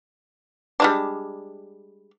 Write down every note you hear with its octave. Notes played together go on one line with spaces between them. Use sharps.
G3 G#3 D4